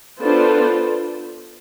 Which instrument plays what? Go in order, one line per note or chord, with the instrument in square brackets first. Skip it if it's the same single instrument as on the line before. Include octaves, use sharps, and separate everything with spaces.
[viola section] B3 D4 F4 A4 C5